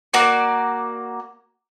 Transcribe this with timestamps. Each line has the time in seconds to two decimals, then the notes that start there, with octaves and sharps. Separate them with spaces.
0.14 A#3 F#4 D5